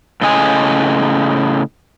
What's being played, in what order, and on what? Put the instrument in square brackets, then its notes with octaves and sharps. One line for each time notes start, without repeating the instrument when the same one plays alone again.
[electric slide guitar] A2 C#3 D#5 G#5